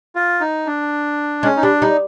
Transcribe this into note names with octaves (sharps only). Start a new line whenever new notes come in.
F4
D#4
D4
G#3 C#4
D#4
G3 D4
G3 D#4